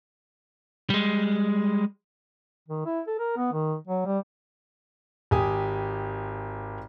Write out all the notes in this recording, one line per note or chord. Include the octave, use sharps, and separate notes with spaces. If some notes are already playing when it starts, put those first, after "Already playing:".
G3 G#3
D#3
E4
A4
A#4
B3
D#3
F#3
G3
G#1 G4 G#5 D#6